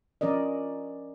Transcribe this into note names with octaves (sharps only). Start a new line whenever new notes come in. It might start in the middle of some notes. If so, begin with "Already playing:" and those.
F3 C#4 A#4 D5 D#5